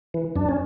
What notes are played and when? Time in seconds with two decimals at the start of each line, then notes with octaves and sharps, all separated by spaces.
0.14 E3
0.36 F#2 D4
0.49 C#4